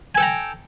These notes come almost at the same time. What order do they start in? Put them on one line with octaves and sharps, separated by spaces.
G#5 A4 G5 A#5